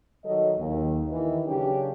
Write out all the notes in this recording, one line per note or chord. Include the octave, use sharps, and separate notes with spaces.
D#3 F#3 A4 D#5
D#2
D#3 E3
C#3 F#3 C#4 D4 G4